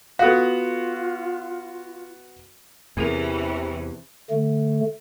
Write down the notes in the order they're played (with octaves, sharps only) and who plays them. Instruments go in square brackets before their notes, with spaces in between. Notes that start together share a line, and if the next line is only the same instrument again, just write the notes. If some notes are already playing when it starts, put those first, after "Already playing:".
[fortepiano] B3 F#4 [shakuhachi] F4 [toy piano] A4 F5
[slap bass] E2 [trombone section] C3 [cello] E3 C#4 [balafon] C4 G#4 A#4
[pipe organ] D3 A3